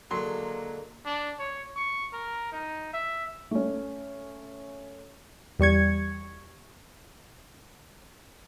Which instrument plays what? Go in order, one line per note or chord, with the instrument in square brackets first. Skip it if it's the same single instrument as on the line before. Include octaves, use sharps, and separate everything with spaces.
[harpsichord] D3 G#3 [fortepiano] F#3 C6 [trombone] A#3
[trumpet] D4
C#5
C#6
A#4
D#4
E5
[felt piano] A3 C#4
[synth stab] E2 G3 C#6 G#6